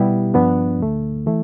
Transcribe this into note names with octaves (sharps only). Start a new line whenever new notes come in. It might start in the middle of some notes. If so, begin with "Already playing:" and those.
Already playing: B2 G3 B3 E4 G4
G2 F3 B3 D4
D2 D3 A3
E3 A3 E4